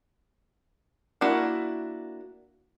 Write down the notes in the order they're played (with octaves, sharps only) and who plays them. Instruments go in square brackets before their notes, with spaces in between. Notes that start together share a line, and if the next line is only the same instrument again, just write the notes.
[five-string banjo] A#3 D4 E4 F#4